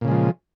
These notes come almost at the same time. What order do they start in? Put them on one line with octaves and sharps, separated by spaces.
A#2 C#3 G#3 F3